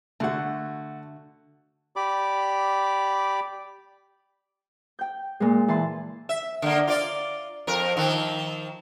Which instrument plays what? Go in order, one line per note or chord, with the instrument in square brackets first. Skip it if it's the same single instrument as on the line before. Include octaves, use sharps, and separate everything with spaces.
[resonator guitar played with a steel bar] D3 F#5 [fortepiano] A3 F#4
[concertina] G4 D5 B5 D6
[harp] G5 G6
A#2 G#3
E3 A5 C6
[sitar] E5
D3 A#3
F4 D5
F2 A#4
D#3 F3